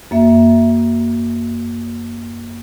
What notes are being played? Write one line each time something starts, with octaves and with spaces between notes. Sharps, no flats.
F#2 A#3 E5